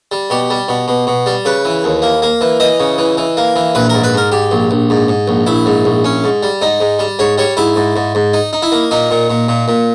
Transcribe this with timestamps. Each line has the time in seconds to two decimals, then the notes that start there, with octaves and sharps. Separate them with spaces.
0.12 G3
0.30 B2 G4
0.50 G3
0.68 B2
0.88 B2
1.07 B2
1.26 G3
1.45 C#3 B4
1.65 E3
1.84 D#2
2.02 A#3
2.22 A#3
2.41 E3
2.60 E3 D#5
2.80 C#3
2.98 E3
3.17 E3
3.37 A#3
3.56 E3
3.75 A#1 B4
3.89 G#2 A#4
4.04 B4
4.14 G#2 A#4
4.32 G#2 G4
4.52 A#1
4.71 A#1
4.90 G#2
5.08 G#2
5.28 A#1
5.47 A#1 E4
5.66 G#2
5.85 A#1
6.04 C#4
6.24 G#2
6.43 G3
6.62 G#2 D#4
6.81 G#2
6.99 G3
7.19 G#2 C#5
7.38 G3 C#5
7.57 G#2 E4
7.76 G#2
7.96 G#2
8.15 G#2
8.34 D#4
8.53 D#4
8.62 E4
8.72 A#3
8.91 A#2 D#4
9.11 A#2
9.30 A#2
9.49 A#2
9.68 A#2